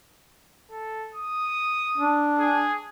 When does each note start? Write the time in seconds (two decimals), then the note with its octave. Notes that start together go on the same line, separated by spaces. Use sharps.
0.71 A4
1.14 D#6
1.98 D4
2.38 G#4